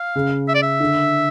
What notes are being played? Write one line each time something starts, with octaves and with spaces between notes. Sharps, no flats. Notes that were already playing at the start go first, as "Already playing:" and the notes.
Already playing: F5
C#3
E5
D5
E5
D3